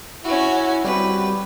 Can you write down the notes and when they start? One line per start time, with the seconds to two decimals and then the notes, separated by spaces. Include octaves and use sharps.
0.24 C#4 E4 F#4
0.85 G3 C4 F#4 G4 B4